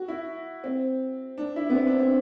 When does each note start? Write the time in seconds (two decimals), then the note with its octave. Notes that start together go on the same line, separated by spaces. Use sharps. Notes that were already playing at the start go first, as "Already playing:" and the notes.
Already playing: F#4
0.08 E4
0.64 C4
1.38 D4
1.56 E4
1.70 B3
1.75 C4
1.87 D4
1.99 C4